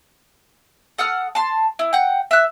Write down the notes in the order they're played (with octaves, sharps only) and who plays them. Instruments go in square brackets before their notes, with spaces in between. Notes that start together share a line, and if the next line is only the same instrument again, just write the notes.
[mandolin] A4 F#5 D#6 F6
A5 C6
E4
F#5 G5
E5 F#6